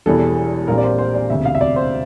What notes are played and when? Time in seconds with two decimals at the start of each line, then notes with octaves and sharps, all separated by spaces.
0.06 E1 E2 E3 G3 A4
0.68 A#1 A#2 G3 C4 A#4
0.78 D5
0.84 C5
0.98 C5
1.15 D5
1.30 E1 D2 C3 E5
1.45 F5
1.55 E5
1.61 D5
1.76 C5